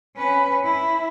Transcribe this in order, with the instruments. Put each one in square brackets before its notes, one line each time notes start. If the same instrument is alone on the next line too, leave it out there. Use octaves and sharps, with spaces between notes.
[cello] C#4 B4
E4